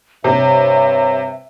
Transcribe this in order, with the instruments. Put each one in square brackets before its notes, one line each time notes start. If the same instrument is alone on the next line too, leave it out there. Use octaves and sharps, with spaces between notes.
[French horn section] G2 C#5 [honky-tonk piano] C3 [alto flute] E5